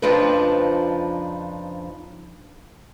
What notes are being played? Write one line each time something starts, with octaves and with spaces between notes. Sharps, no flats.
F2 C#3 F3 D4 D#4 B4